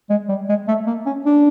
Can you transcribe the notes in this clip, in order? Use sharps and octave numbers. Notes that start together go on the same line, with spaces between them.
G#3
G3
G#3
A3
A#3
C#4
D4